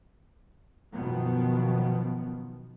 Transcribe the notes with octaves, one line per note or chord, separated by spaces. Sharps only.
F#2 B2 D#3 F3 B3